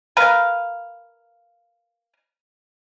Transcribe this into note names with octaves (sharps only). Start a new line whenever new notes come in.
A#4 B4 F5